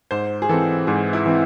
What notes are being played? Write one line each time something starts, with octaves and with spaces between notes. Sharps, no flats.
G#2 C5
G#4
E3 C4 A4
G#2 G#4
E4
E3 C4